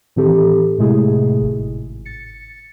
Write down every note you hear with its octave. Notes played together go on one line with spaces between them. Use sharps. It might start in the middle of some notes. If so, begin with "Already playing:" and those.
A2 D#3 E3 C4 G4 A4
A2 C3 G#3 A3 E4 G#4
G#1
A6 C#7